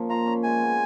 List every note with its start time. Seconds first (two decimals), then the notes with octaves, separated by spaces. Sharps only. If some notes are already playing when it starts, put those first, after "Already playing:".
Already playing: A#2 F3 A#3 C#4
0.10 F4 A#5
0.26 C#4
0.43 G#3 G#5
0.60 B3